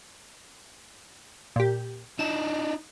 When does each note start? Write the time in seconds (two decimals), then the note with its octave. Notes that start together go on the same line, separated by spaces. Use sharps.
1.56 A#2 G4
2.19 D4 D#4 E7